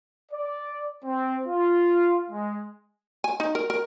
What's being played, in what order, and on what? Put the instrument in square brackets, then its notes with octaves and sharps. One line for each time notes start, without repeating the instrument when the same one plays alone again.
[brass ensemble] D5
C4
F4
G#3
[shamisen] G#5
D#4
A#4
A#4